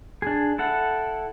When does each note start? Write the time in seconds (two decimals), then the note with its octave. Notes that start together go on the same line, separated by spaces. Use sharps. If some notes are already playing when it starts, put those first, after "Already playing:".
0.22 D4 G#4
0.59 E4 A4 F#5